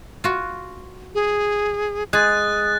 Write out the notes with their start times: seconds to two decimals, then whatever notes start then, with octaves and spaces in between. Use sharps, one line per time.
0.24 F4 F#4
1.15 G#4
2.13 G#3 G#4 D#6 F#6 A6